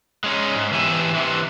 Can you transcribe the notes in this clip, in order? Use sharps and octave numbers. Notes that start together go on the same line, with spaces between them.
G#3 C#4 D#4
G#2
E3 A3 B3 G4 E5 G#5
C3 E3